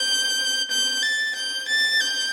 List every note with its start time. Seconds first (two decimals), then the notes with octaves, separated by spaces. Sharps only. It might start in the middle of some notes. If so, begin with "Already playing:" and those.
Already playing: G6
0.71 G6
1.03 A6
1.36 G6
1.68 A6
2.01 G6